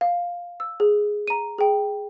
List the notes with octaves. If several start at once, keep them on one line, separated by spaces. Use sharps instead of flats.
F5
E6
G#4
A#5 D#7
G#4 G5